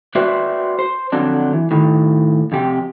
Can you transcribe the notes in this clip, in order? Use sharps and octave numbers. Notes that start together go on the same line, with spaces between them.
F#4 B4 C5 D5 E5 G5
C5
D3 F3 F#3 C4 D4
E3
A2 D#3
F2 C3 G4